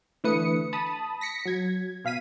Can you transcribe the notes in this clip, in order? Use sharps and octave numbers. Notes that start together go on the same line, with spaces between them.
D3 E3 A3 B4 D#6 C#7
A5 B5 D#6
A#6 B6 C#7
F#3 G#6
B2 F5 B6 D#7